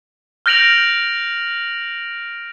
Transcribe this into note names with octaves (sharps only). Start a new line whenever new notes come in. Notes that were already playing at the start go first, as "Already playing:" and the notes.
F6 G6 A#6 D7 F7 F#7